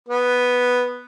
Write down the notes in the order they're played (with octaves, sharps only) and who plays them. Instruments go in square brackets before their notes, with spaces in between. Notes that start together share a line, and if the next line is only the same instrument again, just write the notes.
[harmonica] B3